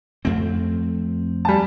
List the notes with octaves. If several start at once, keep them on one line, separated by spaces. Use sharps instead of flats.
F2 A3 C4
G3 G#5 A5